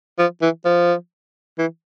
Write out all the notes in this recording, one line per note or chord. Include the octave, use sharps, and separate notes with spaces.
F3
E3
F3
E3